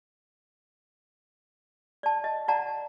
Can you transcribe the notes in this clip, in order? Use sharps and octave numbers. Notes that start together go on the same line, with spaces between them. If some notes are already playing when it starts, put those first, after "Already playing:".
D5 A5
D#5
D5 F#5 A5 A#5